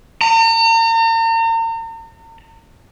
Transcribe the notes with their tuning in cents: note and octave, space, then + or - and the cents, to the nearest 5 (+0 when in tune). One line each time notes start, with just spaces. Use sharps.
A#5 -40